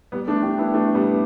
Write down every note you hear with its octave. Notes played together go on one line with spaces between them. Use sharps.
G3 B3
A3 D4
D4 G4
B3 E4
A3 D4
G3 B3